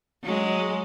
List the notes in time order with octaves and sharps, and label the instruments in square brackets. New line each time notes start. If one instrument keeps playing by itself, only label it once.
[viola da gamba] F#3 G#3